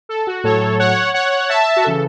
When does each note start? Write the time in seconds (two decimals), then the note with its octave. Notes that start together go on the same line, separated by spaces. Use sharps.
0.09 A4
0.27 F#4
0.44 A2 F#3 A4 C#5
0.79 C#5 F#5
1.14 C#5 F#5
1.49 E5 A5
1.77 F#4
1.84 C#3 E3 A4